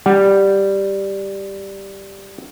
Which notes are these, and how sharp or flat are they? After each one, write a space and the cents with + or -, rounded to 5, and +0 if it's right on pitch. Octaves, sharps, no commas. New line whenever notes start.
G3 +0 F#5 +20